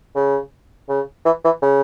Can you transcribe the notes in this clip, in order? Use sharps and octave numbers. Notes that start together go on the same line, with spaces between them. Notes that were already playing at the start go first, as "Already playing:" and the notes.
C#3
C#3
E3
E3
C#3